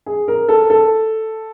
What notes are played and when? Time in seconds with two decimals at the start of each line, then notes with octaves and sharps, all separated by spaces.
0.06 G#4
0.28 A#4
0.49 A4
0.70 A4